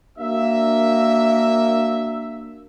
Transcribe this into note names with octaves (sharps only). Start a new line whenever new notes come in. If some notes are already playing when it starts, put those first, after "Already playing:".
A#3 D4 F#4 E5